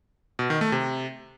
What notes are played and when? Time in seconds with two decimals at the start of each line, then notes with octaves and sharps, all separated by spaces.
0.39 B2
0.50 D#3
0.61 A3
0.72 C3